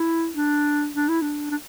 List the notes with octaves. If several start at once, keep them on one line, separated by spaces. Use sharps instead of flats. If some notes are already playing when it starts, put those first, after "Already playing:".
Already playing: E4
D4
D4
E4
D4
D4